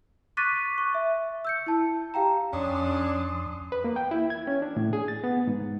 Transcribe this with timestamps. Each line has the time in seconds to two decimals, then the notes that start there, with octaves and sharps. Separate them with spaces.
0.37 C#6 D6 F#6 A6 B6 D#7
0.78 C#6
0.94 E5
1.45 E6 G6 C#7
1.67 E4 A5
2.14 G4 F5 G5 A#5
2.53 F2 C#4 D4 C6 D#6
3.72 B4
3.84 A#3
3.96 G5
4.11 E4
4.30 G#6
4.47 C#4
4.62 D4
4.77 A2
4.93 G#4
5.08 A6
5.24 B3
5.47 G#2